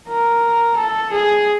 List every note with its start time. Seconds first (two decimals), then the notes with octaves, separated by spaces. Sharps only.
0.08 A#4
0.76 A4
1.12 G#4